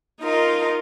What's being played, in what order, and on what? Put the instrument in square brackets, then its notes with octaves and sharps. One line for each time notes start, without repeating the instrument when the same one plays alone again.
[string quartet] D#4 F4 A#4